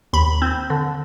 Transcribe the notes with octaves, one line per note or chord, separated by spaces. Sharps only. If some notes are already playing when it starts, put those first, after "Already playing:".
D#2 B5
C4
D3